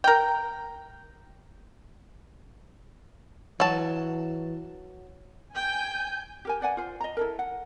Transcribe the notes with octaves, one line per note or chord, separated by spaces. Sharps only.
A#4 G5
E3 F#3 A5
G5 G#5 G6
G4 A#4 G#5
B4 D5 F#5 G#5
F4 C5
D#5 A#5
E4 A4 A#4
F#5